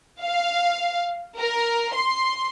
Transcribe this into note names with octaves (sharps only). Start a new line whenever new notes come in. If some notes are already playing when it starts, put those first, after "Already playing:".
F5
A#4
C6